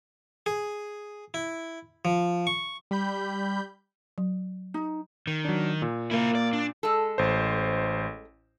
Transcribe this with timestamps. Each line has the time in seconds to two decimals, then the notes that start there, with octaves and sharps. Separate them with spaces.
0.46 G#4
1.34 E4
2.05 F3
2.47 C#6
2.91 G3 B5 G6
4.18 F#3
4.74 D#4
5.27 D#3
5.45 F#3 D4
5.82 A#2
6.11 A#3 E4 A#4
6.35 D5
6.53 D4
6.83 G#3 A4
7.18 A1 C5